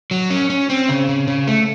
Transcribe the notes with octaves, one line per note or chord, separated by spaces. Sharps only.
F#3
C#4
C#4
C4
C#3
C#3
C#3
A3